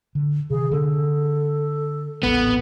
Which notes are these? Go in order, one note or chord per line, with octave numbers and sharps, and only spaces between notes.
D3
C3 D#3 G#4
D3 A3 D4 A4
D#1 A1 B3